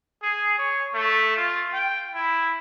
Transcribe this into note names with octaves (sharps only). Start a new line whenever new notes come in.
G#4
C#5
A3
F4
G5
E4